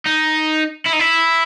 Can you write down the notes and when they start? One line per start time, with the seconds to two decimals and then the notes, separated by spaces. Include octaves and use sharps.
0.06 D#4
0.86 E4
0.93 D#4
1.00 E4